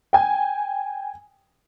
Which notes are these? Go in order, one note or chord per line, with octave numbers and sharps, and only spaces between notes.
G5 G#5